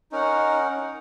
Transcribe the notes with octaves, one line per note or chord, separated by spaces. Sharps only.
C#4 D#4 A#4 F#5